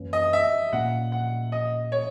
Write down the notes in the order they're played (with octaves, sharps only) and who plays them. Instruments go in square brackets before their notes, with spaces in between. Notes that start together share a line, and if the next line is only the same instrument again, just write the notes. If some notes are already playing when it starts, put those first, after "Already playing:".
Already playing: [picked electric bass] F#2 E3 A#3 C#4
[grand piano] D#5
E5
[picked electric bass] A#2 A#3 C#4 [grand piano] F#5
[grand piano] F#5
D#5
C#5